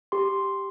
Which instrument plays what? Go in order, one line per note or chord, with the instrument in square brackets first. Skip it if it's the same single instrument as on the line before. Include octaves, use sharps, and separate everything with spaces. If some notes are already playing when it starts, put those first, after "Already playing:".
[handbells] G4 C6